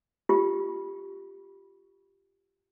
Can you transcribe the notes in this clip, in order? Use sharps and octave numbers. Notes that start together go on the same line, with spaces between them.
F4 G4